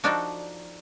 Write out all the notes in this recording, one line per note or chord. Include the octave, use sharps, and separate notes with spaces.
F3 D4 D#4 F#4 A4 D5